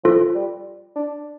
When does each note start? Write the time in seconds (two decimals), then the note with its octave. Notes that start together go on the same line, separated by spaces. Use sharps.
0.04 F3 F4 A4
0.35 G3
0.96 D4